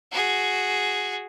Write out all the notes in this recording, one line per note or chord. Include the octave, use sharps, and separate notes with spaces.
F#4 G#4